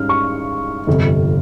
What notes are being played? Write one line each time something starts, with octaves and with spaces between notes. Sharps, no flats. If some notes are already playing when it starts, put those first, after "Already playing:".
Already playing: G#2 G3 C#4 F6
C#6
G1 F2 C3